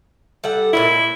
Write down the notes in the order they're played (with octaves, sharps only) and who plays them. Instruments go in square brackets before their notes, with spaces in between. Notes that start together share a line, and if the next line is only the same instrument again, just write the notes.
[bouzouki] G3 A4 F#5
[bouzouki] A#2 G#3 C#4 [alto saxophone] E4